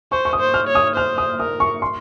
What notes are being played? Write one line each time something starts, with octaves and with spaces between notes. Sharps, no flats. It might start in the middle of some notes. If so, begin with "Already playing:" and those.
C5 C#6
C#6
D#6
C5
F6
C#5
D#6
C5 F6
D#6
A#4 D#6
C#6
C6